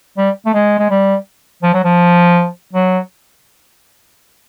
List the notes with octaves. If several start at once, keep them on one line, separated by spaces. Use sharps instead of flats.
G3
A3
G#3
G#3
G3
F3
F#3
F3
F#3